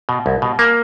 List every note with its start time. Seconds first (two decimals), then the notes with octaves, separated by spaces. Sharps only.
0.09 B2
0.26 C2
0.42 B2
0.59 A#3